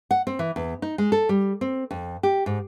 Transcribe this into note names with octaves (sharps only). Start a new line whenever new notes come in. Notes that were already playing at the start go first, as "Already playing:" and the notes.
F#5
C4
E3
E2
D#4
G#3
A4
G3
C4
F2
G4
G#2